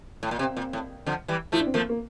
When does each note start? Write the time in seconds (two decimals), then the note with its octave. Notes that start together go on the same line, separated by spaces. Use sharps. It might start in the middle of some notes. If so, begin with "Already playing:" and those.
0.23 A2
0.31 A#2
0.39 C3 C4
0.57 A#2
0.73 A2
1.06 D3 F3
1.28 E3 G3
1.52 F3 A3 E4
1.60 D4
1.66 C4
1.74 F3 A3 A#3
1.89 A#3